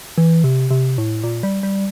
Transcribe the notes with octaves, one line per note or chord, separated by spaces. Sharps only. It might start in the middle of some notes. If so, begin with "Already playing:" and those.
E3
C3
C3
A2
A#2
G3
G3